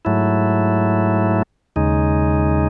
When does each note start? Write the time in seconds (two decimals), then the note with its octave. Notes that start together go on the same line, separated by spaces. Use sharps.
0.05 G#2 F#3 A3 E4
1.76 D#2 C#3 G#3 D#4